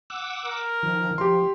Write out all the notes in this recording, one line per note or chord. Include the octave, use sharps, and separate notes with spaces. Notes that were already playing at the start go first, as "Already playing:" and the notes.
F#5 D6 E6
A#4
D#3 F3
F3 G4 C6